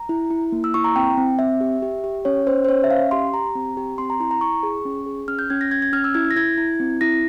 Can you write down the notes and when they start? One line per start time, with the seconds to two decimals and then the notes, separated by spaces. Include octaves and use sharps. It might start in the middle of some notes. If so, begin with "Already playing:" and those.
Already playing: A#5
0.09 E4
0.31 E4
0.52 A#3
0.64 E6
0.74 E4 C#6
0.84 A#5
0.96 C4 G5
1.17 C4
1.39 C4 E5
1.61 G4
1.82 G4
2.04 G4
2.25 C#4 C#5
2.46 C#4 C5
2.64 C5
2.69 C#4 C#5
2.84 E5
2.91 C#4 F5
3.11 G4 C6
3.33 G4 A#5
3.55 C4
3.77 G4
3.98 C4 C6
4.10 A#5
4.20 E4 A#5
4.31 A#5
4.41 E4 C#6
4.63 G#4
4.85 C#4
5.06 G#4
5.28 C#4 F6
5.39 G6
5.50 C#4 G#6
5.61 A#6
5.71 C#4 G#6
5.82 G#6
5.93 C#4 F6
6.04 E6
6.14 E4 G#6
6.31 A#6
6.36 E4 G#6
6.58 E4
6.80 C4
7.01 E4 A#6